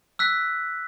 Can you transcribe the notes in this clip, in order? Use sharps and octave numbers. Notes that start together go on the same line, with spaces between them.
E6 F#6 B6